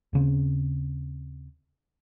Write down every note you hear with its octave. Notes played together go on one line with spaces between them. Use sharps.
D#2 C#3 C4